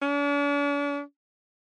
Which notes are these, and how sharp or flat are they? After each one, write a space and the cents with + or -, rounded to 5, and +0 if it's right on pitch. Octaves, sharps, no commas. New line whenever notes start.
D4 -45